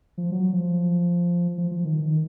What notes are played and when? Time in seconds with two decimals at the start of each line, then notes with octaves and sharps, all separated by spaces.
0.18 F3
0.32 F#3
0.53 F3
1.58 F3
1.71 F3
1.85 D#3
2.00 D#3